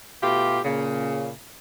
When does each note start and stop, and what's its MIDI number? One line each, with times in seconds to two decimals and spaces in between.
0.22 0.59 47
0.22 0.59 57
0.22 0.59 65
0.22 0.59 67
0.64 1.30 46
0.64 1.30 49